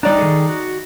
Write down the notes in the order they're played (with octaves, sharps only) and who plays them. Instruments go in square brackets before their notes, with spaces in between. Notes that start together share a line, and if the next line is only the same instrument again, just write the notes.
[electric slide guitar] G3 D4 [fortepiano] D#4 D5 A#5
[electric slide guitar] D#3 G#4 A4
F#4